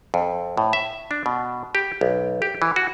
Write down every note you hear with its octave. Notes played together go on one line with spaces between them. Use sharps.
F2
A2
E5
D4
B2
G4
B1
G4
E3
F#4